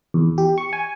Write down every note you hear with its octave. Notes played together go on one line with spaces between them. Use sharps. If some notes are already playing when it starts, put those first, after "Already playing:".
E2
G4
C#6
G#5